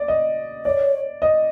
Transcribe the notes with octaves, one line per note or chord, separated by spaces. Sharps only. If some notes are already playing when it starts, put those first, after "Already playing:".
Already playing: D5
D#5
C#5 D5
D#5